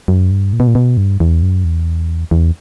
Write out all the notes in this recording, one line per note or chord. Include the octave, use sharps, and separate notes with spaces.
F#2
G2
A#2
B2
A#2
B2
G2
E2
F#2
E2
E2